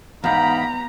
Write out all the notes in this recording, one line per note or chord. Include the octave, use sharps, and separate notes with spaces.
E2 G#2 B3 D#4 F5 G5 A#5 B5